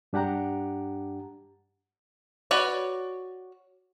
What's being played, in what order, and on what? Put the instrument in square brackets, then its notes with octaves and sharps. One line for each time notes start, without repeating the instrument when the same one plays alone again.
[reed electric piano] G2 D4 G4 F#5 A#5
[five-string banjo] F#4 B4 C#5 D5